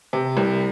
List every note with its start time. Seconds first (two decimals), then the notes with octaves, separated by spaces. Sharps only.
0.13 C3
0.37 C2